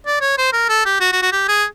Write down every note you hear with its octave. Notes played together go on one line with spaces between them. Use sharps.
D5
C#5
C5
A#4
A4
G4
F#4
F#4
F#4
G4
G#4